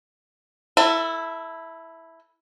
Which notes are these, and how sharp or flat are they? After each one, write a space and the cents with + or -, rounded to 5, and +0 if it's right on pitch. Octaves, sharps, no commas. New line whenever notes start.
E4 -5 A4 +25